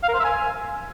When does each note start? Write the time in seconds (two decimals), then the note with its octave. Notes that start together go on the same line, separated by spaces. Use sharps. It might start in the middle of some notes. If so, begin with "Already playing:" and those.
0.03 F5
0.09 A#4
0.14 C5
0.19 E5
0.24 G#5